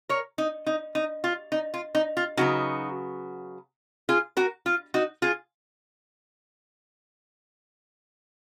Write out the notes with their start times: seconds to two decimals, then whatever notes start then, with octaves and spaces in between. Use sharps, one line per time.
0.09 A#4 C#5
0.38 D#4
0.67 D#4
0.95 D#4
1.24 F4
1.52 D#4
1.74 F4
1.95 D#4
2.17 F4
2.37 C#3 F#3 B3 D#4 F#4
4.09 F4 G#4
4.37 F#4 A#4
4.66 F4
4.94 D#4 F#4
5.22 F4 G#4